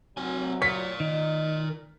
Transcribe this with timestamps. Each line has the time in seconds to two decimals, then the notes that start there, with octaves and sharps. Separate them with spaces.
0.17 C2 F#3 C4 G#5
0.62 A#4 C#5 D5 B6
1.00 D#3 D#4 D#5